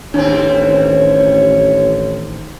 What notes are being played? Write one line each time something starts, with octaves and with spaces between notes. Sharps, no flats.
A1 D#2 C4 D4 C#5